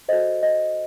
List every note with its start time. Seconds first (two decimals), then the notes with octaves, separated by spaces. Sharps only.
0.09 F#4 A4 C5 D#5
0.43 D#5